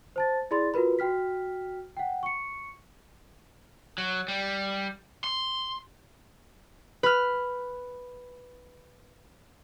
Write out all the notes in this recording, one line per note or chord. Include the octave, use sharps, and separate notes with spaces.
C5 A5 A6
E4 G#4 D5 B5 C6 A6
F4 F#4 A#4 B4 B5
F#4 G5 F6 B6
F#5 G5
C#6 C#7
F#3
G3
C6
B4 F6